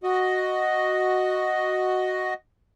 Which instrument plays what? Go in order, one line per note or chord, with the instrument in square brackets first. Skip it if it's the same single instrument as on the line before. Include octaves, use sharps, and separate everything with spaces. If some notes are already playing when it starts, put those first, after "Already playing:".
[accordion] F#4 D#5